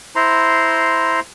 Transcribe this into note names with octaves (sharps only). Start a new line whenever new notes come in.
E4 C5 A#5 C6